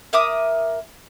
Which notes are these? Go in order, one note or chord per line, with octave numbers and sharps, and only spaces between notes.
A#4 E5 D6 D#6